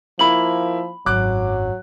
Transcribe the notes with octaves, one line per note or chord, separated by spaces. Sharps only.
F3 A#3 E4 B5 F#7
G#1 F#2 F#3 D6 F#6